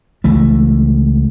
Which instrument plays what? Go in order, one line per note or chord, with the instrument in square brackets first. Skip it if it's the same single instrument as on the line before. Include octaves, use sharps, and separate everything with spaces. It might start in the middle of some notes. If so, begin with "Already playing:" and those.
[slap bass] C#2 E3 A3